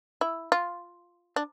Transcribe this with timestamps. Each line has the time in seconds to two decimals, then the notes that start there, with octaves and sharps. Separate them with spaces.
0.21 E4
0.52 F4
1.36 D4